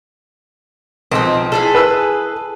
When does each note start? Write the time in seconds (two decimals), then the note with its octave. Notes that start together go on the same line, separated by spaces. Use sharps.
1.12 B1 F3 C4 D#4
1.52 E4 G#4 A4
1.75 B4 E6 F#6